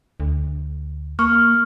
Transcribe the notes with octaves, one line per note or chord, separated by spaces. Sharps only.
D2
A#3 C#6 F6